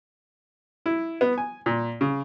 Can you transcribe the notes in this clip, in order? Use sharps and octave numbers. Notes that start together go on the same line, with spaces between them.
E4
B3
G#5
A#2
C#3